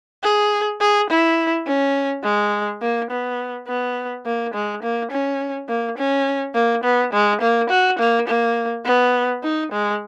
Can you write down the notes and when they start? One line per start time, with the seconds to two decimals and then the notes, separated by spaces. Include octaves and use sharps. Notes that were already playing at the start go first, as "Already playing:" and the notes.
0.23 G#4
0.81 G#4
1.10 E4
1.67 C#4
2.24 G#3
2.82 A#3
3.11 B3
3.68 B3
4.26 A#3
4.54 G#3
4.83 A#3
5.12 C#4
5.69 A#3
5.98 C#4
6.55 A#3
6.84 B3
7.13 G#3
7.41 A#3
7.70 F#4
7.99 A#3
8.28 A#3
8.85 B3
9.43 D#4
9.72 G#3